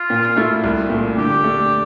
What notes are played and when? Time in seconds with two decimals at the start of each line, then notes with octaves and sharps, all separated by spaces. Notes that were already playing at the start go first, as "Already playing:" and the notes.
Already playing: F4
0.10 A#2
0.37 A3 E4
0.64 C2
0.90 A#2 A3
1.17 D3 G4
1.44 A3 D4